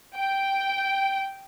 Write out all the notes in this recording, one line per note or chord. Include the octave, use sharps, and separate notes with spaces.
G5